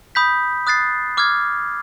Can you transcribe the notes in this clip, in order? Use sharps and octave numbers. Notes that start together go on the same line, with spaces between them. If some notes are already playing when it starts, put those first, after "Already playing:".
B5 D#6 G6 B6
D#6 F#6 A6 C7
D6 F6 G#6